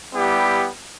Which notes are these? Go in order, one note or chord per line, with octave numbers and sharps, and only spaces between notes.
G3 B3 E4 G4